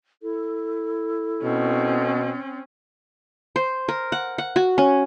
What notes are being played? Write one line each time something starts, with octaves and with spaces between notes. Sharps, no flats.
E4 A4
B2 C4 C#4
C5
A#4
F#5
F#5
F#4
C#4